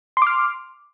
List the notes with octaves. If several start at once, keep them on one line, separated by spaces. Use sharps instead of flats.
C6 D6 F6